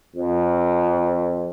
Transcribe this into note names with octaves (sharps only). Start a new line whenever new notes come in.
F2